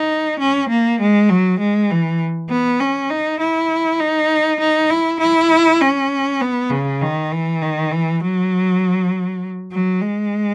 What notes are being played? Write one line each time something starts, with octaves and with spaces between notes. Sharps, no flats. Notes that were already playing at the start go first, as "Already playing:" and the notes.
Already playing: D#4
C#4
A#3
G#3
F#3
G#3
E3
B3
C#4
D#4
E4
D#4
D#4
E4
E4
C#4
B3
C#3
D#3
E3
D#3
E3
F#3
F#3
G#3